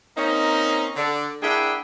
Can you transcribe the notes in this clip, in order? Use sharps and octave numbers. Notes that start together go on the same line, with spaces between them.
A#3 C4 C#4 D#4
D3 D4
A#3 D4 E4 G#4 F#5 G5